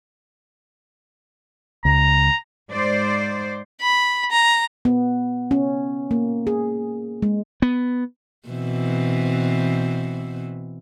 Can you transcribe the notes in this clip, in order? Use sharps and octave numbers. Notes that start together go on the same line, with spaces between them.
C#2 A#5
G#2 C5 D5
B5
A#5
B3
C#4
A#3
G#4
G#3
B3
B2 E3 C4